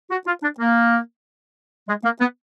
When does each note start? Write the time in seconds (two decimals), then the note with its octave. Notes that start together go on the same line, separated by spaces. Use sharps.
0.10 F#4
0.26 F4
0.42 D4
0.59 A#3
1.88 G#3
2.04 A#3
2.20 B3